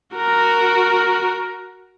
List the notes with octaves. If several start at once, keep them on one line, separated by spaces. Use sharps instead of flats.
F#4 A#4